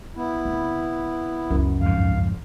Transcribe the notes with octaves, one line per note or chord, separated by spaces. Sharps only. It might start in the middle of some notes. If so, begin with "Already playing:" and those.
B3 E4
C#3 C4
C#2 F#2
F2 G#2 F5